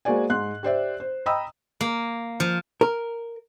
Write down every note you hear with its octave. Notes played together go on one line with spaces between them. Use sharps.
G#3 A#3 F#4 C5 D5 G#5
G#2 C6 F#6
G4 C5 D5 E5
C5
D#5 G5 A#5 B5 D#6 E6
A#3
F3
A#4